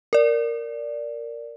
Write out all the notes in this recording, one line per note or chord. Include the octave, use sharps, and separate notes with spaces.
A#4 D5